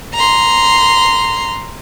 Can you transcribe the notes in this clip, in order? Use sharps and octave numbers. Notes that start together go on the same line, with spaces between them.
A#5 C6